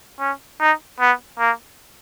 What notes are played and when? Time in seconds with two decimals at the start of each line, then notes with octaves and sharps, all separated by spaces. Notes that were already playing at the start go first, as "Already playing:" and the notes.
0.20 C#4
0.60 D#4
1.00 B3
1.39 A#3